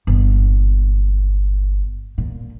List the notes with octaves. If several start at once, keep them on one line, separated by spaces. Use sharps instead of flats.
G1 A#2
A#2